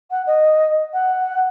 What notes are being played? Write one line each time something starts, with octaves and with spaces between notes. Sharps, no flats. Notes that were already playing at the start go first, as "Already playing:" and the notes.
F#5
D#5
F#5